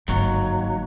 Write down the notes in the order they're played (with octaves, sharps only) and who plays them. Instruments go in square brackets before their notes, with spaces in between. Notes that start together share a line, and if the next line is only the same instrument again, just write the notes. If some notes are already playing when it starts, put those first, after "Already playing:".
[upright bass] G1 G#2 [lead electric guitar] D#2 F#3